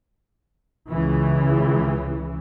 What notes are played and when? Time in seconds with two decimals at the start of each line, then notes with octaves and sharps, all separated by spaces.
0.90 C#2 C#3 E3